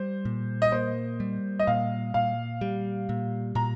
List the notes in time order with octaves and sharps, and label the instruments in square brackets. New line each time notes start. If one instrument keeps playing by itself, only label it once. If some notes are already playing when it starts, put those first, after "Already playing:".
Already playing: [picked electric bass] G3 [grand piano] C5
[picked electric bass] A#2
[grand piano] D#5
[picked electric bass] A#3 [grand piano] C5
[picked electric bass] G3
[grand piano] D#5
[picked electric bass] A#2 [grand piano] F5
[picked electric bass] A#2 [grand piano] F5
[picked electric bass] G3
A#2
[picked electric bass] A#2 [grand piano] A#5